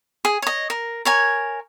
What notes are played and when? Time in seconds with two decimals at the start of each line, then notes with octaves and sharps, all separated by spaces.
0.25 G#4
0.42 C#5 D#5
0.70 A#4
1.05 A#4 C#5 G#5